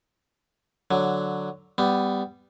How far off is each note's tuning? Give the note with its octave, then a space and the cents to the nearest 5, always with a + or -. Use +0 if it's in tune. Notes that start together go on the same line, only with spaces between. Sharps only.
D3 +0 F#3 +0
G3 +0 B3 +15